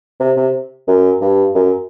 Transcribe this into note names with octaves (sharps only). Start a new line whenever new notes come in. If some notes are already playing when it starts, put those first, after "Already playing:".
C3
C3
F#2
G2
F#2